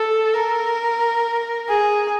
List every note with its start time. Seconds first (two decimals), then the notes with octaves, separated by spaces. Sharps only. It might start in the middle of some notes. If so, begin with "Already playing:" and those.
Already playing: A4
0.34 A#4
1.69 G#4